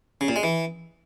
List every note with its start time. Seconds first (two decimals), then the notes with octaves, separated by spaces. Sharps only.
0.21 C#3
0.28 A#2
0.36 G#3
0.43 E3